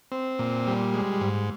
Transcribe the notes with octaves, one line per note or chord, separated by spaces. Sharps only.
C4
A#2
G3
G#3
G#2